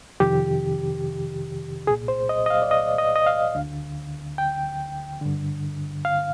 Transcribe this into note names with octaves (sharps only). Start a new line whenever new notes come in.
F2 C3 D#3 G4
C2 A#2 G#4
C5
D#5
D#5
F5
D5
D#5
D#5
D#5
F5
D2 D3
G5
G2 D3
F5